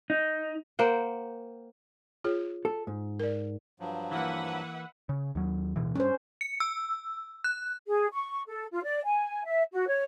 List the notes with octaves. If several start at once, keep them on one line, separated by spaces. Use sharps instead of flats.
D#4
A#3 C5 F#5 G5
F4 G#4 C#5
A4
G#2
A#4 D5
G2 F3 F#3
E3 A#3 B4 E5 F#5
C#3
D#2 F#3
D1 B2 E3
G2 C#4 C5
C#7
E6
F#6
G#4
C#6
A4
F4
D5
G#5
E5
F#4
C#5